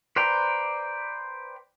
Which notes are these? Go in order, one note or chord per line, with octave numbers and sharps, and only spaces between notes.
B4 C5 D5 G5 A#5